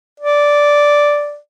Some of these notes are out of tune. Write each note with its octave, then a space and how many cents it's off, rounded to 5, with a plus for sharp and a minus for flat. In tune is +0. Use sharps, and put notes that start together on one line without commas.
D5 -5